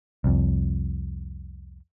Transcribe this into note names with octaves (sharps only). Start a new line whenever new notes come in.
C2 F2